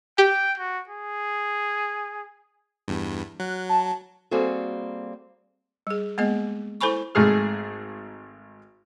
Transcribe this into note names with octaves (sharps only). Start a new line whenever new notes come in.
G4 G5
F#4
G#4
E2 G2
F#3 F#6
A5
G3 A#3 C4 F#4 G#4 A4
G3 G#4
G#3 A#3 B3 G#4 D#5
E4 A4 C5 G#5 B5 C#6
G#1 G#2 A3 G#4 F6